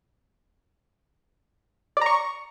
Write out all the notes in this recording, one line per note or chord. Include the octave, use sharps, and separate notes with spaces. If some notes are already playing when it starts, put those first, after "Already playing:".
D5 A#5 C#6